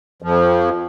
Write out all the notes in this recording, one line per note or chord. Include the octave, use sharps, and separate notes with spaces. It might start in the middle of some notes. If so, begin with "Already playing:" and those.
F2 F3